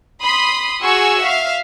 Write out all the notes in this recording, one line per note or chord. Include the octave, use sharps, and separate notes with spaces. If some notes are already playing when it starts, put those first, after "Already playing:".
B5 C6 D#6
F#4 G#4 G#5 C#6 E6
E5 F5